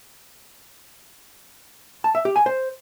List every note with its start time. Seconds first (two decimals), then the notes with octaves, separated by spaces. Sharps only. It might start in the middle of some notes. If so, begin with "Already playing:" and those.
2.04 A5
2.15 E5
2.25 G4
2.36 G#5
2.46 C5